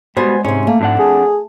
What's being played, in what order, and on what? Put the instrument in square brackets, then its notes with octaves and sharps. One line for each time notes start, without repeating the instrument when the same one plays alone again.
[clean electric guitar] B2 G3 [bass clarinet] G#3 [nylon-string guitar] B3 C5 G#5
[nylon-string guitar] G#2 C3 [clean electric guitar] C#4
[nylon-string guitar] A3 [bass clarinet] A#3
[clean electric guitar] F2 D4 F#5 [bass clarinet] G#2
[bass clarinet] G#4